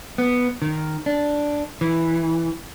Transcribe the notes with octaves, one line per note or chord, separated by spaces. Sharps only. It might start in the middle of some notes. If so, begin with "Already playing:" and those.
B3
D#3
D4
E3